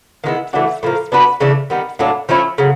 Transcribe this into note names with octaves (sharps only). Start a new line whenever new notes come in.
D#3 G#3 B3 E4
E3 A3 D4 F#4
A2 F3 A#3
B3 D4 F#4 B4
C#3 E3 A3 D4
D#3 G3 B3
A2 F#3 A#3 D4
F3 A3 C#4 E4
C#3 F#3